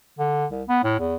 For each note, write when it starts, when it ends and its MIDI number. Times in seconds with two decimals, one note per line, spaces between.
0.19 0.46 50
0.51 0.63 36
0.68 0.79 59
0.84 0.98 45
0.99 1.15 40